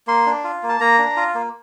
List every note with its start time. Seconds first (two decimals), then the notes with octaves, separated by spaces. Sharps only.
0.07 A#3 C6
0.26 D4
0.44 F4
0.63 A#3
0.69 A5
0.80 A#3 A#5
0.99 D4
1.17 F4
1.35 A#3